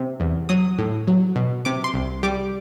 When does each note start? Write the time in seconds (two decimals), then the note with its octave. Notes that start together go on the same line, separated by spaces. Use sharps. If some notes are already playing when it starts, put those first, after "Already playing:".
Already playing: C3
0.20 E2
0.49 F#3 D#6
0.78 A2
1.07 F#3
1.36 B2
1.65 C3 D6
1.84 C6
1.94 C2
2.23 G3 D6